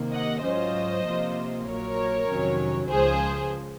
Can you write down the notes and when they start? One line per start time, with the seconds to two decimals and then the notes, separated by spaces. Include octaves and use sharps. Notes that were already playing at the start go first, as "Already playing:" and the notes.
Already playing: C3 D#3 A#3
0.13 D#5 F#5
0.43 G#2 F#3 C#4 F4 C5 D#5
1.05 C3 F3 A#3 F4
1.66 A#1 A#2 F#3 A#3 A#4 C#5
2.27 F2 C3 D#3 F#3 C#4
2.88 C#2 C#3 F3 G#4 C5